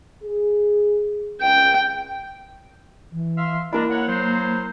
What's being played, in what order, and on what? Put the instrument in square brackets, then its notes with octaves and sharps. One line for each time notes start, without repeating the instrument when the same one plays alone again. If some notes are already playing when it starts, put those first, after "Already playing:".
[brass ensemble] G#4
[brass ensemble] C#2 [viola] G5
[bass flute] E3
[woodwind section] E5 F5 C6
[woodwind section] G#3 D4 [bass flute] A#3 [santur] E4 A#4 A#5
[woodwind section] C#5 F#5
F#3 C5